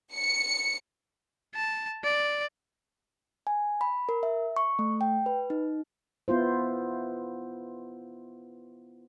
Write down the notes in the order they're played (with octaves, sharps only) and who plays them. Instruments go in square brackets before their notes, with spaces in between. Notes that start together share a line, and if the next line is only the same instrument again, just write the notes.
[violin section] C#7
[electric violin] A5
D5
[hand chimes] G#5
B5
A#4
E5
C#6
A3
G5
B4
D#4
[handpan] B3 E4 F4 C5